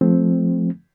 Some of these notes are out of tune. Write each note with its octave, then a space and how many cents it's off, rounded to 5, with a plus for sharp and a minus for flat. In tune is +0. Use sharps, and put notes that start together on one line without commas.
F3 +5 A3 -15 C4 +0